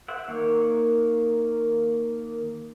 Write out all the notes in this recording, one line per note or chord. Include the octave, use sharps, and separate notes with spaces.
C5 E5 F#5
D#3 A#3 C#5